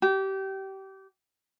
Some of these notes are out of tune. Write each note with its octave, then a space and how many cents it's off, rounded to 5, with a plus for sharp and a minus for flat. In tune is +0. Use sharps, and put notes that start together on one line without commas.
G4 -25